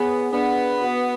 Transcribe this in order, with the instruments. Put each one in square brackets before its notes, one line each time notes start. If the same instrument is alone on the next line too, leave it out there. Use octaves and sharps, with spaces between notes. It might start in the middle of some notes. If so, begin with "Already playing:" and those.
Already playing: [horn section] B3 [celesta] G#4 C#5 G#5
[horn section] B3 [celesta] D4 G#4 D5 F#5 B5
[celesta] F#4 B4 F#5